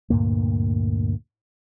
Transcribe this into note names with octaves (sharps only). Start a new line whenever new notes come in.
D2 G2 A#2 A#3